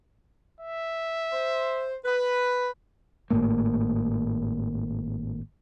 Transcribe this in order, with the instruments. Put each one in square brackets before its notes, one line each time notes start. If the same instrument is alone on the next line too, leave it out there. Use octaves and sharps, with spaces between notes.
[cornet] E5
[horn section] C5
B4
[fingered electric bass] G#1 A2 A3 A#3